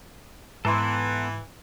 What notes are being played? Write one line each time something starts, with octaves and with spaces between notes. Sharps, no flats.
G#2 E3 B3 A4 A#5 C6